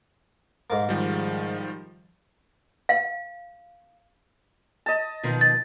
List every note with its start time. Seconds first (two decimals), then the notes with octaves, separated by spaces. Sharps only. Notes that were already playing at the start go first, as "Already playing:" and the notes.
0.70 G#2 A#3
0.89 D#3 F3 G3
2.89 F5
4.86 D#5 A5
5.23 B2 D#3 F3
5.41 A6